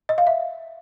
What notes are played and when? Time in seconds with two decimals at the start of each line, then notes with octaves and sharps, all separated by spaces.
0.09 D#5
0.18 F5
0.27 E5